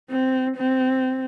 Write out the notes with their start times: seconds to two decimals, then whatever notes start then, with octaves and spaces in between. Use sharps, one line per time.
0.10 C4
0.56 C4